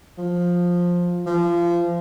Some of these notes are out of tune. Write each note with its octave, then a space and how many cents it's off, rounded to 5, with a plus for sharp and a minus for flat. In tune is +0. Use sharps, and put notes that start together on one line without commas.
F3 +10
F3 -25